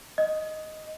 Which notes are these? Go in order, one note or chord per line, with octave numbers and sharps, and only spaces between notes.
D#5